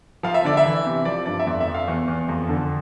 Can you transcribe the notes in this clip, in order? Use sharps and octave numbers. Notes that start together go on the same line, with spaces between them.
F3 F5
E5
D3 D5
E5
E3
C3
F3 D5
G2 D5
E5
F2 D5
E5
F2
F5
E2
E2
F2
D3